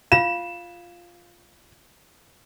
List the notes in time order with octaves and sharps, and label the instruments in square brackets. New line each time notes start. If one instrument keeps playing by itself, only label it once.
[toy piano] F4 F5 [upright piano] E7